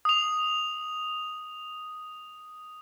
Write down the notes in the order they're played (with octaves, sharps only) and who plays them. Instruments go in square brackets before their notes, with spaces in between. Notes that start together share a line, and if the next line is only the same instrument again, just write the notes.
[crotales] D#6 F7